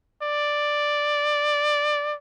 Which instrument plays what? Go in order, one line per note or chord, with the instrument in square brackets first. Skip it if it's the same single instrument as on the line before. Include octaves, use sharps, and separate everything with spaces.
[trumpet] D5